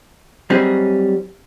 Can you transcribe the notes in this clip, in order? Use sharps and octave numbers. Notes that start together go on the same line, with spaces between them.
F#3 G3 C4 C#4 D#4 G#4